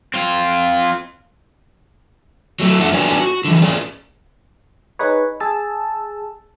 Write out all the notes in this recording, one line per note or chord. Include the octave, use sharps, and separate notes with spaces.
C4 F4
F#3 A3
F2 D4 E5 F#5
D4 F#4 B4 C#5 D5 G#5
F#4
D3 E3
C#4 G#4 C5 D5
D#4 G#4 B4 C#5
G#4 A5 E6